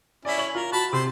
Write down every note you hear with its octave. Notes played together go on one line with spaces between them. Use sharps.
C#4 E4 D5 B6
C#5 F#7
F4 A#4
F#4 A5 B5
C3 C5